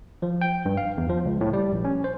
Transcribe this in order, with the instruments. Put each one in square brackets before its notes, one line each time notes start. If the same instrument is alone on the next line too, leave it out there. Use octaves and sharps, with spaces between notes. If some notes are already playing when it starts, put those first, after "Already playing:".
[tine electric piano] F3
G5
G2
F5
E2
F3
C#2
A2
G3
A#1
C#4
C5